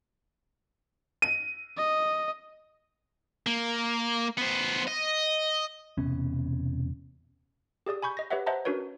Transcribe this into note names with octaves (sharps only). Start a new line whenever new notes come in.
D#7
D#5
A#3
B3 C5
D#5
E1 C3 B3 C#4
G4 G#4 D5 D#6
G#5 B5 C#6 G6
D#5 A#6
G4 B4 C#5 D#5 E5 F#5
C5 D#5 E5 F#5 A5 A#5
C#4 D4 F#4 A#4 B4 C#5